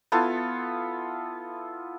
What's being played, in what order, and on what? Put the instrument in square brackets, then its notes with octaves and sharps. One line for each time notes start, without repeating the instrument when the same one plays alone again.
[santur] B3 E4 F4 A4